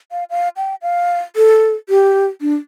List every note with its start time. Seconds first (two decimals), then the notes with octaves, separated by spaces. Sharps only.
0.12 F5
0.30 F5
0.57 G5
0.82 F5
1.36 A4
1.89 G4
2.41 D4